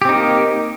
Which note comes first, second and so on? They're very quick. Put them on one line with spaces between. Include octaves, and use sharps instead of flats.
G4 C4 D#4 A#3